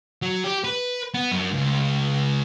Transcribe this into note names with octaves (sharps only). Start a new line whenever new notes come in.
F#3
G4
B4
B3
F#2
C#2